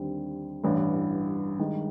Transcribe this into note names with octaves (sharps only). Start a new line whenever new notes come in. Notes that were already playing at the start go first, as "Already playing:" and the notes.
Already playing: D#2 D3 G3 C4
A1 G2 E3
G2 D#3 G#3